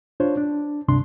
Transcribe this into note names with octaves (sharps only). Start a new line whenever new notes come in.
D4 F4 C5 C#5
D4
D2 G2 C3 D4 C6